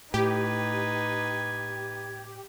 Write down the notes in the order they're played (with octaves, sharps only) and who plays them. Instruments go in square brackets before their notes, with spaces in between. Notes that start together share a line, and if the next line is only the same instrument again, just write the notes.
[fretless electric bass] A2 [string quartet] D#4 B4 [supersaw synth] G4 [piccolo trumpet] G#6